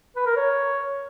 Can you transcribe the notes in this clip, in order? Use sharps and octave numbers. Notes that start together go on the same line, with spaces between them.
B4
A#4
C#5